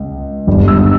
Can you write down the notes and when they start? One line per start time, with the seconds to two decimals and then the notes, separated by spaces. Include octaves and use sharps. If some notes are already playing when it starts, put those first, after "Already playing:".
Already playing: C#2
0.47 G1 G2 G3
0.68 E6